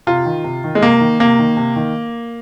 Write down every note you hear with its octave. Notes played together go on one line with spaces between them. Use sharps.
C3 F4
D#3
C3
D#3
G#3
C3 A#3
D#3
C3 A#3
D#3
C3
D#3